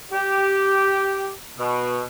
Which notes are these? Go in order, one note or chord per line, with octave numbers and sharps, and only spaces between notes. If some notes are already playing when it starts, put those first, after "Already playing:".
G4
B2